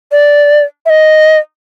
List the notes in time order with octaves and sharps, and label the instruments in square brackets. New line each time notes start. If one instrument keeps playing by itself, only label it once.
[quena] D5
E5
D#5